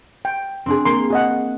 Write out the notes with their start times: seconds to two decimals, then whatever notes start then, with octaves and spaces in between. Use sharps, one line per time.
0.25 G5
0.66 C4 D4 G#4
0.85 A#3 C6
1.10 G#4 D#5 F#5